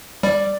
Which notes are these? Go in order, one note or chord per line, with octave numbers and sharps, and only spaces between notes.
G3 D5